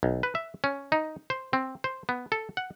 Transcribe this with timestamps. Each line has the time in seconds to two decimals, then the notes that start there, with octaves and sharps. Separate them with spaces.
0.03 B1
0.23 B4
0.35 E5
0.64 C#4
0.92 D#4
1.30 C5
1.53 C4
1.84 C5
2.09 B3
2.32 A4
2.57 F#5